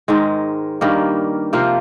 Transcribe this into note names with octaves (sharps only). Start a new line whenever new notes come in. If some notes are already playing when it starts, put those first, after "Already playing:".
G#2 D#3 G#3
G2 D#3 G3 A#3
C3 F3 A#3 F4